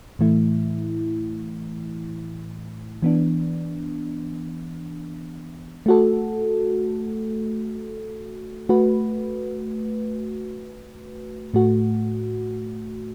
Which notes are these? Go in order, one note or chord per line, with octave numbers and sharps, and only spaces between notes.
A2 E3 A3 E4
E3 B3 D4
A3 F#4 A4
A3 F#4 B4
A2 A3 F#4